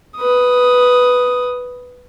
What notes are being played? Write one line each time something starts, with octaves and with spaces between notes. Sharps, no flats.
B4 D#6